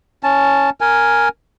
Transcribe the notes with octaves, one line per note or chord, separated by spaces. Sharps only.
C#4 A5
A#4 G#5